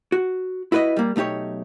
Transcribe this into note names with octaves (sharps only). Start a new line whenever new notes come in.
F#4
E4 F#4 B4 C#5 D#5
G3 A#3
B1 A3 D#4 G4 C#5